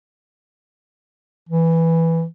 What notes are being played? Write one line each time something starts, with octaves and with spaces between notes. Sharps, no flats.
E3